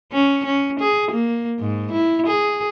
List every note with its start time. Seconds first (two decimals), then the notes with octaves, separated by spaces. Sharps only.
0.13 C#4
0.46 C#4
0.80 G#4
1.12 A#3
1.60 G#2
1.92 E4
2.27 G#4